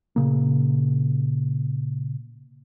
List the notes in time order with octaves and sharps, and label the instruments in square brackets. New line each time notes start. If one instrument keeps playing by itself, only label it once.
[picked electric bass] A#2 C#3 A#3